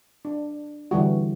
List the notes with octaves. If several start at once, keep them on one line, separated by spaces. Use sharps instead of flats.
D4
D3 E3 G3 F#4